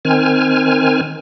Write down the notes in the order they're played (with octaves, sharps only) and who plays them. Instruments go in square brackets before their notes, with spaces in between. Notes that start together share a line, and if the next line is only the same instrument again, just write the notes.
[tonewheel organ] D#3 C4 G#5 F6